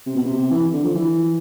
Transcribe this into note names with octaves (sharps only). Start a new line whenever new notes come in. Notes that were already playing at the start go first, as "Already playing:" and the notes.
C3
B2
C3
E3
D3
F3
E3